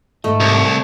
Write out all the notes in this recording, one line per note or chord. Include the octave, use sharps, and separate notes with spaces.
G#2 A3 D#5
C2